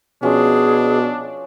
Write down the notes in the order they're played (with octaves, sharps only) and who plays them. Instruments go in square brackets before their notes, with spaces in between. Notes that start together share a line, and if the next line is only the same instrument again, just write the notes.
[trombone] B2 [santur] F3 C#4 [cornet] D4 [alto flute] G#4